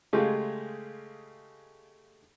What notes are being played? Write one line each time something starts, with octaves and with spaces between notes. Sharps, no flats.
C#3 G#3 A3 F4 G4 G#4